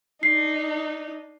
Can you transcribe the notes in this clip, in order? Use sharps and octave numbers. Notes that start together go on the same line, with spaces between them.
D4 D#4 C7